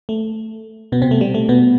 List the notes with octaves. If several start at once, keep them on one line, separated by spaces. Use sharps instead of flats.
A3
B2 B3
C3 C4
A3
G3
A3
B2 B3